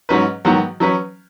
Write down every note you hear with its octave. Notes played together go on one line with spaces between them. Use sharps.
G#2 F#3 C#4 B4
G#2 D#3 F#3 B3 F#4
F#3 C#4 B4